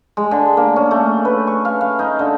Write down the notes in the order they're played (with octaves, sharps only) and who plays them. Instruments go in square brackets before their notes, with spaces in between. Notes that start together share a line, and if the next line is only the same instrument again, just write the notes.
[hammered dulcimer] G#3
D3
A#3
C#4
A3
B4
C#6
F5
F5
D#4
D3